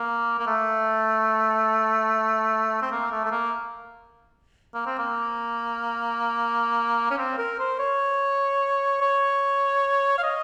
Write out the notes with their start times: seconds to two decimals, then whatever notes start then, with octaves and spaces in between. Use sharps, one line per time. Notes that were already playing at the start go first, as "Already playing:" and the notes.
Already playing: A#3
0.39 A#3
0.47 A3
2.82 C4
2.92 A#3
3.11 A3
3.25 A3
3.31 A#3
4.74 A#3
4.86 C4
4.99 A#3
7.11 C#4
7.18 C4
7.38 A#4
7.60 C5
7.79 C#5
9.01 C#5
10.18 F5
10.23 D#5